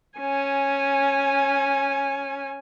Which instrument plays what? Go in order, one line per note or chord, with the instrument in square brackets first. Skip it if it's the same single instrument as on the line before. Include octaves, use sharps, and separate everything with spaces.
[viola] C#4 G#5